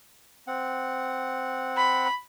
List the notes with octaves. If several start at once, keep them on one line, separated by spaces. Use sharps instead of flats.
C4 F#5
B5